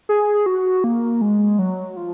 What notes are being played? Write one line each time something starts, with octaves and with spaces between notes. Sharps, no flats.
G#4
F#4
A#3
G#3
F#3
F3